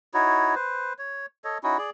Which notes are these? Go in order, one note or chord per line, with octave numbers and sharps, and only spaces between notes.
D#4 E4 F#4 C#5
B4 C5
C#5
A4 C#5 D#5
C#4 D#4 E4 F#4
G#4 D5